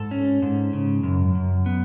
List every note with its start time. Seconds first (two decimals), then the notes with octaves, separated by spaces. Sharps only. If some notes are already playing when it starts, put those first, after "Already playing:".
Already playing: G#2 A4
0.11 C#4
0.42 G#2
0.73 C#3
1.03 F#2
1.35 F#2
1.66 B3